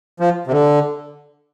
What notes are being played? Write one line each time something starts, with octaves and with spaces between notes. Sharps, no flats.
F3
C3
D3